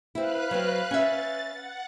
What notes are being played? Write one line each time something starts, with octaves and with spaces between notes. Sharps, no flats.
C4 E4 B4 F5 F#6
F#3 C4
C#4 E5 A6
F#5